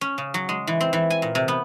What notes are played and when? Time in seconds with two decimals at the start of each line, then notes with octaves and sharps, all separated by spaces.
0.01 C#4
0.18 C#3
0.34 F#3
0.49 G#3
0.67 E3
0.81 C4
0.93 E3
1.10 G#5
1.22 A#2
1.35 C3
1.48 B3